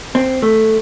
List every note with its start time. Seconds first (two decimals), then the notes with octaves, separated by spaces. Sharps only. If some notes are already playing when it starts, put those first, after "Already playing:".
0.15 C4
0.42 A3